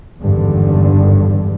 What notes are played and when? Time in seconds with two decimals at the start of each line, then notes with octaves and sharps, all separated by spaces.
0.21 G#1 E2 G2 D3